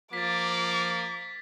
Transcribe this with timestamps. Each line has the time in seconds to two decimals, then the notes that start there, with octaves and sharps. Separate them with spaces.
0.13 F3 A#3 D6 A6 B6